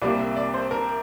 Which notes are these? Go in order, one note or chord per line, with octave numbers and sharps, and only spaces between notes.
C2 C3 G3 A#3 D5
E5
D5
C5
A#4